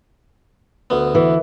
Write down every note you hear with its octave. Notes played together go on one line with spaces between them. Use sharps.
D2 B3
E3